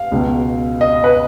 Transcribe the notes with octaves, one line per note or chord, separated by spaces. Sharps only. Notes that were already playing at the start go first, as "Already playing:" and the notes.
Already playing: F5
C#2 B2
D#5
B4